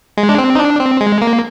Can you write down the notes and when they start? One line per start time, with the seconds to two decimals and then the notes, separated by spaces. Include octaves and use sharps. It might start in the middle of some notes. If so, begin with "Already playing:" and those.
0.17 G#3
0.29 D4
0.38 C4
0.55 D#4
0.59 D4
0.80 C4
1.01 G#3
1.21 A#3